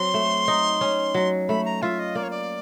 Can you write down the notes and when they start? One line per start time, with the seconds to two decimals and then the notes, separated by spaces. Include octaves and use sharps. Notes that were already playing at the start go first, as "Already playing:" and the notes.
Already playing: F#3 C4 C6
0.14 A3
0.48 D#4
0.81 C#4
1.14 F#3
1.48 A3 B5
1.65 A#5
1.82 F4 E5
1.99 D#5
2.15 A#3 D5
2.23 C#5
2.30 D5